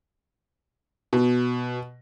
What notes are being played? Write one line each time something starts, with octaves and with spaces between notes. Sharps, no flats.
B2